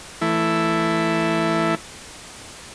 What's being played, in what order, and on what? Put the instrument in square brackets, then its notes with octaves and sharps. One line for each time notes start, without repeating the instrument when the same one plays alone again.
[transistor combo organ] E3 A3 E4